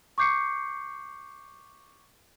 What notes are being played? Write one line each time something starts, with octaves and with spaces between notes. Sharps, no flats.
C#6 D6 G6 C7 C#7